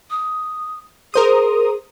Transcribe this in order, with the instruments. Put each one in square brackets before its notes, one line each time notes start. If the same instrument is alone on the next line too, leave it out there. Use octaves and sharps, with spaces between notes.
[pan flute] D#6
[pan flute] G#4 [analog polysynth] A#4 C5 D#6